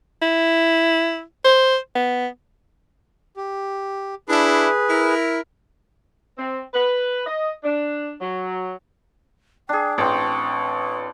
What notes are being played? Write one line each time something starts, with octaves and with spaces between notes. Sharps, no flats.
E4
C5
B3
G4
D4 E4 G#4 B4
E4 A#4
C4
B4
D#5
D4
F#3
D4 G#4 G5
A1 C4 A5 C#6